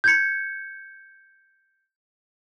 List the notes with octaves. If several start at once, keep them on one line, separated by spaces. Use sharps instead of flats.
G6 G#6 C#7